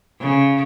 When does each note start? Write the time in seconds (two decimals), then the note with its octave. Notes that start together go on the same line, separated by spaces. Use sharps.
0.20 C#3